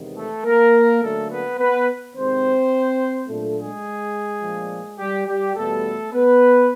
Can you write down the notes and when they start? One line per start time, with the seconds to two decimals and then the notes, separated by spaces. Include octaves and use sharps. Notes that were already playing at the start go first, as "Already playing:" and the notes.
Already playing: E2 C3 D#3 G#3 B3
0.16 A3 A4
0.45 A#3 A#4
1.01 D3 F#3 A3 A#3 C#4 A4
1.30 B3 B4
1.58 B3 B4
2.15 C3 D#3 G#3 C4 C5
3.28 A#2 F#3 A3 A#3 D4 F4 A4
3.57 G#3 G#4
4.42 A#2 F3 A3 D4
4.98 G3 G4
5.27 G3 G4
5.55 E2 B2 G3 A3 B3 A4
6.12 B3 B4